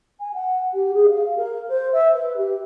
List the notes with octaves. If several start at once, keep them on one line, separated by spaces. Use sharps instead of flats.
G#5
F#5
G4
G#4
F5
A#4
C5
E5
B4
G4